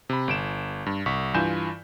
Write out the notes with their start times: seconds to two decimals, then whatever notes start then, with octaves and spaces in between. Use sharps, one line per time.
0.09 C3 B5
0.28 G1 D7 E7
0.86 G2
1.06 C2 C#6 B6
1.34 G2 E3 F4 G#5 G6 E7